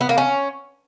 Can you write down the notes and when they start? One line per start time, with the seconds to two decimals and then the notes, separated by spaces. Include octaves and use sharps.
0.01 B3
0.09 A#3
0.18 C#4